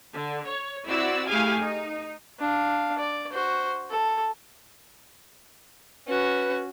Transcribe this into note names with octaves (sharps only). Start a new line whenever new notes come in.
D3
C#5
C4 E4 F#4 D5 E6
A3 E4 G4 G#4 F5 G#5
D#4
D4 F5
D5
F#4 C5
A4
C#4 F#4 B4